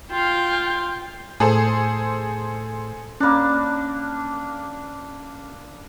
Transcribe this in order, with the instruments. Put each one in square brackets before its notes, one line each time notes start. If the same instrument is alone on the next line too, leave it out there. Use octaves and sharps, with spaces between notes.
[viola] F4 F5 [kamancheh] G5
[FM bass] A2 [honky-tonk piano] G#4 A4 C5
[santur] A#3 D4 [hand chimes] C#4 B5